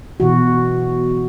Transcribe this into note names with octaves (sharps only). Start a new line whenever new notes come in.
B2 E3 F#4